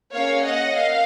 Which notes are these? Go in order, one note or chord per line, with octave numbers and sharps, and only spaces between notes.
A#3 C#4 G#4 C#5 F5
D#5 F#5
A#3 F5